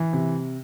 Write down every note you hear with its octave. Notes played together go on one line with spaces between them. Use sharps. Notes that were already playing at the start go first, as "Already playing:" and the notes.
Already playing: E3
C3